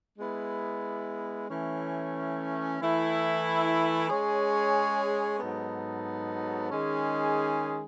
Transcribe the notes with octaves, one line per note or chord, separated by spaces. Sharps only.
G#3 B3 E4
E3 A3 C#4
E3 A3 E4
G#3 C#4 G#4 C#5
G#2 F#3 B3 D#4 A4
D#3 G#3 C#4 G#4